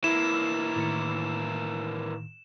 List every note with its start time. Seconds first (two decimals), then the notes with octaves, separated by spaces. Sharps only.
0.04 E3 A#3 E4 E7
0.76 A2 D#3 C#7